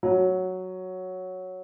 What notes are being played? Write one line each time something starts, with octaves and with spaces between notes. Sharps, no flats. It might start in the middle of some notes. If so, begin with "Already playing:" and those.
F#3